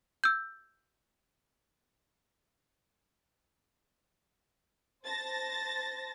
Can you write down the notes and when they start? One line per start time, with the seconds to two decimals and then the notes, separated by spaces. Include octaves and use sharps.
0.24 E6 G6
5.04 C5 A5 A6 A#6